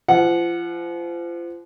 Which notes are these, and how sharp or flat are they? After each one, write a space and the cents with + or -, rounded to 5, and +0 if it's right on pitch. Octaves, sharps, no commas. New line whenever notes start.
F3 -30 F#5 -5